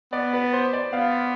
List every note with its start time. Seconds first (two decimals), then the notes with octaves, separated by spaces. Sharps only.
0.13 B3 D5
0.33 B4
0.53 C5
0.73 D5
0.93 B3 F5